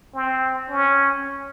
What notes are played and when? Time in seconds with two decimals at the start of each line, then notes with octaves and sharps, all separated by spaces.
0.14 C4
0.70 C#4